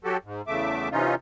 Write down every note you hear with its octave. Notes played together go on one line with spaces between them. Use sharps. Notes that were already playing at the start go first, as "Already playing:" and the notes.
F#3 F#4 G4 A4
G#2
E2 C#3 A3 E5 D6
C3 E3 C#4 D#4 F4